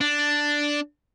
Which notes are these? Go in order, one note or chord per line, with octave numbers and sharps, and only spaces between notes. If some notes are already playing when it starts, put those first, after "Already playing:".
D4